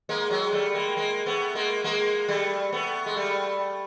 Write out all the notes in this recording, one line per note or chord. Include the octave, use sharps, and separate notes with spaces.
G#3 A#3
F#3 G#3
G3 A3
G#3 A#3
G#3 A#3
A3 B3
G#3 A#3
G#3 A#3
G3 A3
A3 B3
G#3
G3 A3